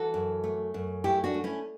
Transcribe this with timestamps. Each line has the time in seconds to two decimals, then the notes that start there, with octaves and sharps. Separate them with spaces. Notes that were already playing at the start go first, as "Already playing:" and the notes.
Already playing: E3 F#4 A4
0.14 F#2
0.44 A3
0.74 F#2
1.04 A3 E4 G4
1.24 D4 F#4
1.34 A3
1.44 C#4 E4